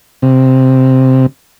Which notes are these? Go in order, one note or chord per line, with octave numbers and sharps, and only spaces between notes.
C3